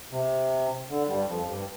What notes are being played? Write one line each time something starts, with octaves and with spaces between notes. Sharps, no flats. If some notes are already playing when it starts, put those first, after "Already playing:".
C3
D3
G2 G3
F2 F3
G2 G3